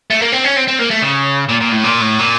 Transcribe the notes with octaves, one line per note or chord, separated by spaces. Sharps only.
A3
A#3
C4
C#4
C4
C4
A#3
A3
C#3
A#2
A#2
A2
A#2
A2
A#2